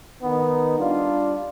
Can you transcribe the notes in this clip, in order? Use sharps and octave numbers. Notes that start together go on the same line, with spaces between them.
D#3 B3 D#4
G3 D4 F4